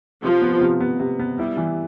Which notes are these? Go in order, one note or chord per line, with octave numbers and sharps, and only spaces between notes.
C3 F3
B3
C3
B3
C3
B3
G3 E4
E3